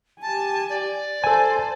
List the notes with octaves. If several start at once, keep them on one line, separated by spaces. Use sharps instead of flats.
G4 G#5 A5
D5
A4 C5 G#5 A5